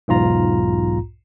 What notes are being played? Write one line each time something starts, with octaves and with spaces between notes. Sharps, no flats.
B1 E2 G#2 F4 A#5